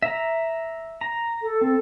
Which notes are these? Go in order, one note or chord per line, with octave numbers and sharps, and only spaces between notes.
E5 A#5
A#5
A4
C4 A4